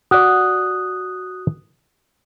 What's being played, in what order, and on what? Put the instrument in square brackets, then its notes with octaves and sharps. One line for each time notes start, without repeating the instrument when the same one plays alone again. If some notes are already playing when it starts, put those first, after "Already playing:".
[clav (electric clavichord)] F#4 D5 [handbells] D#6 F#6